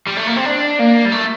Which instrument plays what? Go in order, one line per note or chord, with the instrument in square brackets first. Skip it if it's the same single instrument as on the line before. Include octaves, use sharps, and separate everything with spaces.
[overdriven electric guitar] G3
A3
A#3
C4
D4
A#3
G3
A3